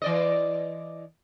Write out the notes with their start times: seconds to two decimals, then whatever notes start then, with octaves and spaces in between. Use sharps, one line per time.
0.02 E3 D5 D#5